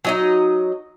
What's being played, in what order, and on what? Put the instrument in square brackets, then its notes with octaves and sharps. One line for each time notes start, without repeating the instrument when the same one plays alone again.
[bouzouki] F#3 D#4 D#5